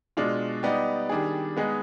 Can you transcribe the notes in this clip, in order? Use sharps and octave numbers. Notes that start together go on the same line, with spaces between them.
B2 G#3 D4 F4
G3 B3 D#4 G4 D5
D#3 G3 D4 G#4
G#3 B3 D#4 G#4